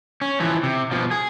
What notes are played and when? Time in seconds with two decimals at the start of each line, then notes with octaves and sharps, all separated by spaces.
0.21 C#4
0.40 E3 F3
0.63 C3
0.91 B2 F3
1.11 G#4